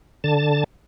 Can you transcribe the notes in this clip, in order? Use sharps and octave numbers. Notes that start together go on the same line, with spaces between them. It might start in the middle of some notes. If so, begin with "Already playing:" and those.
D3 A5